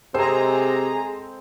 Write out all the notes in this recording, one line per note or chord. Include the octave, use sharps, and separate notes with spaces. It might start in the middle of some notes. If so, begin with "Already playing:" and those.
C3 G#3 C4 G#4 A4 C5 A#5